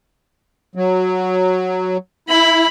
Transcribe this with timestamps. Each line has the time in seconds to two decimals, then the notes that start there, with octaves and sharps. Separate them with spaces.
0.75 F#3
2.29 E4 B5